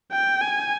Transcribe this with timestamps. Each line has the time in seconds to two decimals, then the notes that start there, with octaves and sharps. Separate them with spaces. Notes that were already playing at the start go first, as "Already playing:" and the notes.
0.12 G5
0.41 G#5